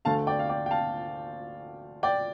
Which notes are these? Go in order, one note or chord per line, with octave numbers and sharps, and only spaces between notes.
D2 D3 A3 D4 F5 A5
D5 G5
F5
D5 G5
G5
F5 A5
D5 G5